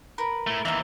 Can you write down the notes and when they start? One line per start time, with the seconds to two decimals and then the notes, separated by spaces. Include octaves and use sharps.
0.18 A#4 B4
0.47 A3 E4
0.65 D#2 E3 E5 A#5